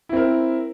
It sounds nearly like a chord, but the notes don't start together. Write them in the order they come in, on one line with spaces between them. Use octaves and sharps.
E4 C4 A#4